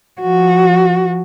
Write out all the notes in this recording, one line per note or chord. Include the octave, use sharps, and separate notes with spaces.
F3 F#4